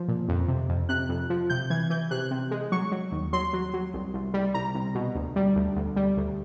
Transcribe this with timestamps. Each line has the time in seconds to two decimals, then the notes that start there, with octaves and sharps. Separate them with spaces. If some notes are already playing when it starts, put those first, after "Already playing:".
Already playing: F3
0.08 A#2
0.29 F2
0.48 C3
0.69 F2
0.89 C3 F#6
1.09 F2
1.30 F3
1.50 C3 G6
1.70 E3 G#6
1.90 E3 G6
2.11 C3 F#6
2.31 C3
2.51 G#3
2.72 F#3 C#6
2.92 F#3
3.12 D#2
3.33 F#3 C6
3.53 F#3
3.74 F#3
3.94 C2
4.14 C2
4.34 G3
4.54 C2 A#5
4.75 C2
4.95 B2
5.15 D2
5.36 G3
5.56 D2
5.76 D2
5.96 G3
6.17 D2